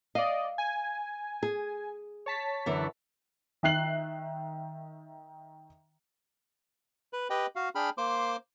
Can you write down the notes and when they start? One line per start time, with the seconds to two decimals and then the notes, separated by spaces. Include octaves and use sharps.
0.15 D5 D#5 F5
0.58 G#5
1.43 G#4
2.26 C#5 A5 B6
2.66 F#2 D3 E3
3.63 D#3 E5 F#6 C7 F#7
7.13 B4
7.30 G4 B4 D#5 G5
7.56 F#4 F5
7.75 D4 G#4 G5 B5 F6
7.98 A#3 C5 C6 D6